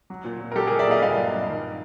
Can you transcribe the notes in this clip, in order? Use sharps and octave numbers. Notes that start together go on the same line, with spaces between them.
F#3
A#2
A#2
A#4
F#3 G4 A4
G#4 A#4
F#3
D5 E5
A#2 D#5 F5
G2 D#5 F5
F#3
G2
D#3